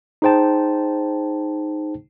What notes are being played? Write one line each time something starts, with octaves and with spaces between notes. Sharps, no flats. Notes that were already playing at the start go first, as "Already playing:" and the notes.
D#4 G#4 C5 G5 A5